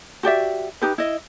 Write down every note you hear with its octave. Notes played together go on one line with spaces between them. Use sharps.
F#4 G4 D5 E5
D#4 G4 B4
E4 D#5